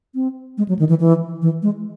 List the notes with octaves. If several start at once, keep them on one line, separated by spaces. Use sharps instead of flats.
C4
G#3
F#3
D#3
E3
E3
E3
G#3